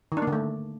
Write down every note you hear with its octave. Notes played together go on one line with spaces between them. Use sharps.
D#3
D4
A#3
D3
A3